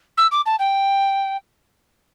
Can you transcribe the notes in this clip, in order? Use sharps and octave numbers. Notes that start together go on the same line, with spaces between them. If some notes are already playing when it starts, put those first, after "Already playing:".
E6
D6
A5
G5